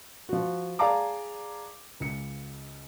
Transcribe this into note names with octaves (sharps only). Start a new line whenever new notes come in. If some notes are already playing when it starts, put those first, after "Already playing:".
F3 F#4
G#4 D5 F5 A5 A#5 D6
C#2 C#7